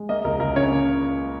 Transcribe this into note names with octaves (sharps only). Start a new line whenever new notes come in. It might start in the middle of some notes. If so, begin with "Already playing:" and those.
Already playing: G#3
A#3 D#5
C#2 A#4
C#2 A#4
C#3 C#5
A#3